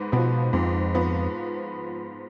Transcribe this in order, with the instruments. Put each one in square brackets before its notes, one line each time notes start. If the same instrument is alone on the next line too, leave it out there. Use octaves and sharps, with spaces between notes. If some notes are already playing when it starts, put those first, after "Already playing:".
Already playing: [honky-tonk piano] G#2 B3
[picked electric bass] B2 [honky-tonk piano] F3 B3
[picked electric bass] F2 [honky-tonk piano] G#2
[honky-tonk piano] F3 B3